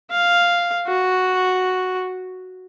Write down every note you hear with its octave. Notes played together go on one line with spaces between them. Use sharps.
F5
F#4